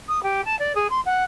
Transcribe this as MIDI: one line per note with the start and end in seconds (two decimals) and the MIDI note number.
0.08 0.22 87
0.23 0.44 67
0.45 0.57 81
0.59 0.72 74
0.75 0.87 68
0.90 1.00 84
1.05 1.24 78